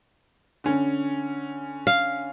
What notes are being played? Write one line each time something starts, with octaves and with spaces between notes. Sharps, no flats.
D3 C#4
F5